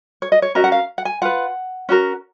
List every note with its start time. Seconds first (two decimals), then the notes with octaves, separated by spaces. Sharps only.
0.22 C#5
0.32 D#5
0.42 C#5
0.55 C#4 F#4 A#4 D#5
0.64 F#5
0.72 F5
0.98 F#5
1.05 G#5
1.22 F4 B4 F#5
1.89 C#4 F#4 A#4